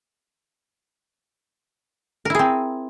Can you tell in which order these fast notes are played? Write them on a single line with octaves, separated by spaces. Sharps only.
A#4 E4 G#4 C4